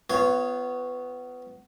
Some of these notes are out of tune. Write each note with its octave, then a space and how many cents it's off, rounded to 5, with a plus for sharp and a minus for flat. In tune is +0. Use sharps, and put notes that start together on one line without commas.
B3 +20 F4 -25 C#5 +0